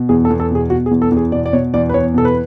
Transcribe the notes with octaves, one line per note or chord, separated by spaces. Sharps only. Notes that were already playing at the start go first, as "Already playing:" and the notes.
Already playing: B2
E2 G#4
A4
E2
A4
B2 G#4
B2 F#4
G#4
E2
A4
E2
G#4
B2 D5
D5
B2 C#5
E2 D5
B4
E2 C#5
B2 A4
B4